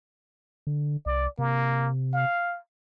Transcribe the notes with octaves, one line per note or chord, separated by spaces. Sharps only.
D3
C2 D5
C3 A#3
F5